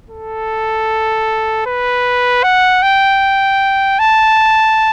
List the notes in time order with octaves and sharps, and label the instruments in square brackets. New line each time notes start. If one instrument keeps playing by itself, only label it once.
[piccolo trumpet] A4
B4
F#5
G5
A5